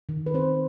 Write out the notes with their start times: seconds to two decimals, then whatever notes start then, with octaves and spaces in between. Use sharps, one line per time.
0.09 D#3
0.26 B4
0.34 C4 C5